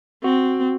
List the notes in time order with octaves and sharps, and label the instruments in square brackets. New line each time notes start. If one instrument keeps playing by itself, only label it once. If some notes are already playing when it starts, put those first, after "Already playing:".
[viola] C4 [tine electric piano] F#4